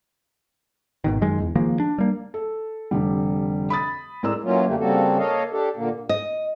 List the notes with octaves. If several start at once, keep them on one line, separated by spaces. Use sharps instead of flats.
G#1 B2 D#3
F#2 D#3 G#3
E1 E2
D#3 F3 G#3 A#3
D4
G3 A#3
A4
F1 D3 G3
B5 D#6 A6
A2 G#3 A#4 D5 A#5 E6
E3 F#3 A#3 C#4 F4
F#2 D3 G3 A3 A#3
C#3 G3 A#3 C4 F#4 A4
A#3 A4 C#5 D#5 F5
D4 G4 A4
A#2 D3 A#3
D#5